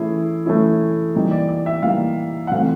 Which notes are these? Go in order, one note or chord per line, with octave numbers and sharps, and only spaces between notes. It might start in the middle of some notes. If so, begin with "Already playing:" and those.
Already playing: E3 A3 C#4 E4 G#4
E3 A3 C#4 E4
E3 G3 A#3 D#4
D5
D5
E5
E3 G3 A#3 D#4 F5
F#5
E3 A3 C4 F4 F5